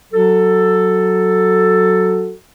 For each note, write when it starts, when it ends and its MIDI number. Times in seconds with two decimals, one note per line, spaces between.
0.12 2.32 54
0.12 2.32 66
0.12 2.32 69